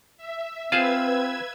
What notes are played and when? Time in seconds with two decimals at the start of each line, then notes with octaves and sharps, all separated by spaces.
0.17 E5
0.72 C4 F4 G#4 B4 C5 F5 E6 G#6